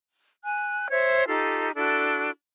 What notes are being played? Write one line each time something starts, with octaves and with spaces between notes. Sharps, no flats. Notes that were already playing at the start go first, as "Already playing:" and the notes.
G#5 F#6
C5 C#5 E5
D#4 F4 G4 A4
D4 E4 F#4 A4